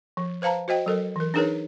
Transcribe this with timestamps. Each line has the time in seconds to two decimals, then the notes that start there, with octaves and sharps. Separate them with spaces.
0.17 F3
0.42 B4 C5 F5 A5 A#5
0.68 F#4 C5 D#5 G5
0.86 F#3 A4 A#4
1.16 E3 A#4
1.34 D4 D#4 G#4 A#4 B4 C#5